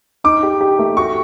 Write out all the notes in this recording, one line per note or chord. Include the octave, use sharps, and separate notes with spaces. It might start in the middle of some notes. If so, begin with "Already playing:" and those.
D#4 D6
G4
G4
A3
F#4 C#6